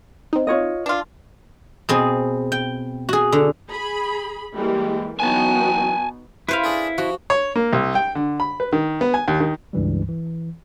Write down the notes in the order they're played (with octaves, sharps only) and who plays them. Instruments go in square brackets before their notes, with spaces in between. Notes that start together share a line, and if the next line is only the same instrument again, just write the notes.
[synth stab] C4 D#4
[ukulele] F4 C#5 D#5
[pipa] D4 F4
[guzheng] B2 C4 G#4
G5
F#4 G#4
D3
[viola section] G#4 B5
[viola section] E3 G3 A#3 [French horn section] G#3 G4
[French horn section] F#2 E3 F#3 [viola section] B3 D#4 F#4 [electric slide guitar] G#5 A5
[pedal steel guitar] E4 [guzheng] B4 C5 F5
[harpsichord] D4 G#4 A4
[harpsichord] F3 [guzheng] F#4
[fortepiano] C#5
A#3
C2
G5
D3
B5
B4
D#3
B3
G#5
D#2
D#3
[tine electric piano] C#2 G2 E3 G3
E3